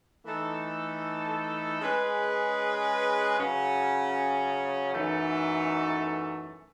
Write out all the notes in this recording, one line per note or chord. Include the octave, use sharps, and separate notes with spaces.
E3 A3 D#4 A4
G#3 C#4 G#4 B4
C#3 F#3 C#4
F#2 E3 A3 D#4 A4